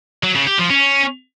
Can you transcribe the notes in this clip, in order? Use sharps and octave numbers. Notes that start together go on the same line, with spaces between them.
F#3
C#3
G4
F3
C#4